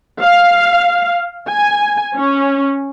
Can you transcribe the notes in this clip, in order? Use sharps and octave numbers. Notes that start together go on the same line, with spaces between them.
F5
G#5
C#4